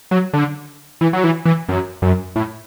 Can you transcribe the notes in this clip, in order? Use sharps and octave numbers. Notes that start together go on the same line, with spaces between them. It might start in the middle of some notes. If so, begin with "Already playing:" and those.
F#3
D3
E3
F#3
E3
E3
F#2
F#2
A2